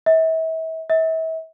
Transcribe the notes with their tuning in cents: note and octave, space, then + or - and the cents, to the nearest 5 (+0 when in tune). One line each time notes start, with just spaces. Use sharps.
E5 -35
E5 -35